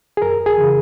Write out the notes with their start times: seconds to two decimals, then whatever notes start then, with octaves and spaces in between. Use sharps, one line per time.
0.17 G#4
0.22 F#2 A#4
0.46 G#4
0.57 C#3 E3